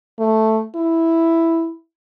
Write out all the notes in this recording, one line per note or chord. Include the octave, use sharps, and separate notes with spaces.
A3
E4